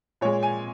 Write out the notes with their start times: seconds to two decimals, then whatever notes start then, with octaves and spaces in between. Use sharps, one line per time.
0.21 A#2 G#3 C#5
0.43 G#5